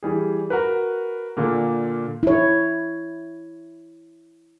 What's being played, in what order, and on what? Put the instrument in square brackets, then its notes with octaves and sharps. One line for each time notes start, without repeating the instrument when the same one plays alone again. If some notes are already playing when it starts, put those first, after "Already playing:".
[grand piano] E3 G3 G#4
F#4 A#4 B4
A#2 D3 A#3
[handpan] E4 C#5